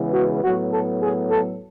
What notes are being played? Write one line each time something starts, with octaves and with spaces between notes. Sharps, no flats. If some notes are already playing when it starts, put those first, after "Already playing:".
Already playing: C#3 E3 G#3 B3
F#4
A2 F#3 B3 F#4
A4
G#4
A4